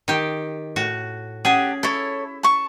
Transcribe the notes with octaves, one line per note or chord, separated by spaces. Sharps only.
D#3 G4
A2 F#4
C#4 G4 G#4 F#5 A5
E4 A4 C#5
A5 C#6